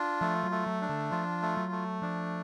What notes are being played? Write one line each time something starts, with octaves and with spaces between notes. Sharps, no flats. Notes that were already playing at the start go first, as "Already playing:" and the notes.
Already playing: D4 F4
F3 A3
F#3
A3
F#3
D4
D3
F3 F4
A3
F#3
A3
F3 D4